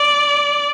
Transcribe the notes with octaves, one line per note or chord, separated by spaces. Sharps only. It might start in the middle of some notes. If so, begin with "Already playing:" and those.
Already playing: D5